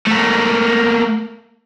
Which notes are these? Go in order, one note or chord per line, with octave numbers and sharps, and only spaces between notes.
A3 A#3